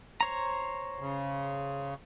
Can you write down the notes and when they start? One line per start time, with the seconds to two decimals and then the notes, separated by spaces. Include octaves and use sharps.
0.21 C5 C#5 A#5
0.99 C#3